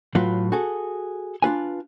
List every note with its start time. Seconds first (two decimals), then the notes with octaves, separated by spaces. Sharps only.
0.15 A2 F#3 F4 F#4 B4
0.52 F#4 G#4 A4
1.42 D4 F4 B4 G#5